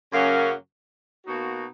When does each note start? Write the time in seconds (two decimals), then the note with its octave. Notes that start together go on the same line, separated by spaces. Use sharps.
0.13 F#2 C#3 F#3 A#3 C#4
1.26 B2 A#3 D#4 F#4